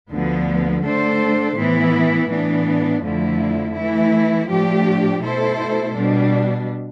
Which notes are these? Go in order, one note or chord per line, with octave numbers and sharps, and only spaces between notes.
D2 D3 F3 B3
D3 A3 D4 A4 C5
A2 E3 B3 E4
A2 E3 B3 D4
F2 D3 F3 A3 E4
E3 A3 E4
A2 F3 A3 D4 G4
B2 A3 E4 A4 C5
B2 G3 D4